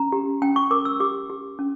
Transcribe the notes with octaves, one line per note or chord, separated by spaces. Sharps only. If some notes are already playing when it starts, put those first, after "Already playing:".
Already playing: C#4 A#5
G4
C#4 G5
C#6
A#4 D6
E6
G4 D6
G4
C#4